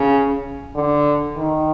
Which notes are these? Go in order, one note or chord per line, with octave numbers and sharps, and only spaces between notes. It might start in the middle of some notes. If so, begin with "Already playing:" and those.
Already playing: C#3
D3
D#3